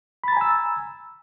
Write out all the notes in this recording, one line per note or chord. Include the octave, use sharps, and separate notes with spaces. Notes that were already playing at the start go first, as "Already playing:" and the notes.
G#5 A#5 B5 E6 A6